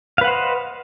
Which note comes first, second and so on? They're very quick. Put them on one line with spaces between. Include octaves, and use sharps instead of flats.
F5 B4 F#5 C5 D#5